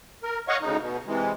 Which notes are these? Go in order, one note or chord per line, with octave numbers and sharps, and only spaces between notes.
A#4
C#5 D#5 F5 F#5 C#6
D2 C#3 D#4
B2
C3 E3 G#3